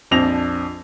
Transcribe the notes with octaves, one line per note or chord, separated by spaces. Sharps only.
A#1 F2 F3 D4 A#6 F7